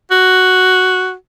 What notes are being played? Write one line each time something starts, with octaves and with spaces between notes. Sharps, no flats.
F#4